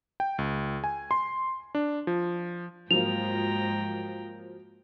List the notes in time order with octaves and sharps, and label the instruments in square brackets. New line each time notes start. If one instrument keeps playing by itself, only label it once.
[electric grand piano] G5
C#2
G#5
C6
D4
F3
[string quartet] G#2 G5 A#5 [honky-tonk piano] F3 F#3 A#3 [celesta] F7